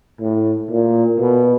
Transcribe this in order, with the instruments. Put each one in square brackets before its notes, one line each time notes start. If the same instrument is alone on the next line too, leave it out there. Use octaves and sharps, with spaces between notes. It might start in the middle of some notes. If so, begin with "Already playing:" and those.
[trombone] A2
A#2
B2